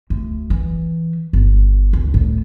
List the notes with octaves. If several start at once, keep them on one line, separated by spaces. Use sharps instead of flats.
D2
E3
G1
C#2
A2